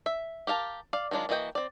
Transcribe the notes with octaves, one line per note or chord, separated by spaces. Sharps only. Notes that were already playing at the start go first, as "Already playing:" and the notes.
E5
G4 A#4 F5 A5
D5 F5
D#3 F#3 G#3 D4 F4
E3 A#3 F#4 D#5 G5
C4 D5